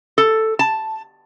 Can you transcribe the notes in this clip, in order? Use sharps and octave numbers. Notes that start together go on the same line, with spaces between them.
A4
A5